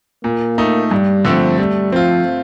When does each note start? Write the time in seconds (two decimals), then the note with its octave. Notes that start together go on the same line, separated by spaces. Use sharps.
0.24 A#2 A#3
0.58 A3 D#4
0.91 G2 G3
1.25 D3 F3 A3 C4
1.59 G3 A3
1.92 F3 C4 F4